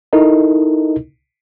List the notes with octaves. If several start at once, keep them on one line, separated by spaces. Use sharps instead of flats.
D#4 E4 A4 A#4 D#5